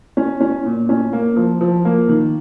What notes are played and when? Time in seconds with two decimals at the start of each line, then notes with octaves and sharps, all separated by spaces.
0.17 C#4
0.40 C#4
0.65 A#2
0.89 C#4
1.13 A#3
1.36 F3
1.61 F3
1.85 A#3
2.09 D#3